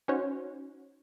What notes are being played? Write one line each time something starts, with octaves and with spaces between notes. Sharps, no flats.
C#4 D#4 F#4 C5 C#5